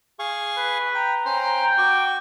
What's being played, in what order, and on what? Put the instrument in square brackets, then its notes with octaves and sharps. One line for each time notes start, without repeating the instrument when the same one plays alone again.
[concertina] G#4 F5 C#6
[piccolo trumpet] B4
[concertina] G5 [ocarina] A#5
[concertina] C#4 C5 C6 [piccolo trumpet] G5
[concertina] F#4 C#6 [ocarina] D6